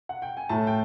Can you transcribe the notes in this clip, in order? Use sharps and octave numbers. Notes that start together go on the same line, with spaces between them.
F#5
G5
G#5
A2 A5
G5